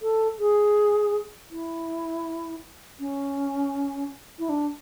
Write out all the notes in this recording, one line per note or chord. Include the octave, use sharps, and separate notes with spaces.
A4
G#4
E4
C#4
E4
D4